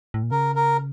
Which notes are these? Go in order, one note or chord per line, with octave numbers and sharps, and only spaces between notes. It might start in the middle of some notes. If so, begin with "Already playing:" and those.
A2
A#2
C#3 A#4
A#4